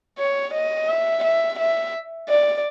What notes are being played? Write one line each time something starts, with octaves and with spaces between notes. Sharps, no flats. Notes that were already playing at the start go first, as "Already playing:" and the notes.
C#5
D#5
E5
E5
E5
D5